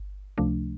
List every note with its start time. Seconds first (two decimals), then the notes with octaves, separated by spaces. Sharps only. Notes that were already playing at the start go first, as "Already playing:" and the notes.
Already playing: G1
0.38 C#2 C3 F3 A3 D4